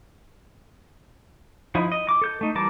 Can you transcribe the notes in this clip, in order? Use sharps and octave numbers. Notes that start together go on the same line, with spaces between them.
F3 D#4 E4
D#5
D6
A4 G6
A3 D#4
E3 G3 A#4 A5 D6